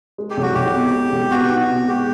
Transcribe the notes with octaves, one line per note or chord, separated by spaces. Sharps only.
G#3
G4
B1
F#4
B1 G4
B2
G#3
B1
B3 F#4
D#4
F#4
B2
G#3 G4